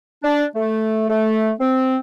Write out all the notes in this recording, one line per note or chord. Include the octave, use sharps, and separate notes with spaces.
D4
A3
A3
C4